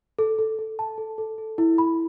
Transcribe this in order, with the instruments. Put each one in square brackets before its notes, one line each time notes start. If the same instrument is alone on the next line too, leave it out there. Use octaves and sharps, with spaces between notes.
[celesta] A4
A4
A4
A5
A4
A4
A4
E4
B5